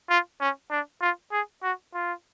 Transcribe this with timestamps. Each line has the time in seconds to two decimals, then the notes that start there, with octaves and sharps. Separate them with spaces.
0.09 F4
0.41 C#4
0.70 D4
1.01 F4
1.32 G#4
1.63 F#4
1.94 F4